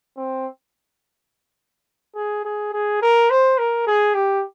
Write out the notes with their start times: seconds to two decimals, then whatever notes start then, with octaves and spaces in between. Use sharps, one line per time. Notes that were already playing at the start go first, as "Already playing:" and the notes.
0.17 C4
2.15 G#4
2.45 G#4
2.73 G#4
3.02 A#4
3.30 C5
3.58 A#4
3.87 G#4
4.14 G4